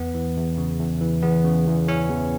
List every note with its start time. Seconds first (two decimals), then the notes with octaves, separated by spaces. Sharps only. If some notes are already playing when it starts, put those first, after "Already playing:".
Already playing: E2 B3
0.15 E3
0.37 E2
0.58 C#3
0.80 E2
1.01 E3
1.23 E2 B3
1.44 C#3
1.67 E2
1.88 E3 C#4
2.10 E2